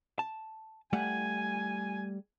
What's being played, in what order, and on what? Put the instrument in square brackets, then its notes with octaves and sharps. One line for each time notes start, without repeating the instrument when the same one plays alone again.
[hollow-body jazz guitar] A5
[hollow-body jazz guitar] G3 A3 F#5 [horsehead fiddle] G#5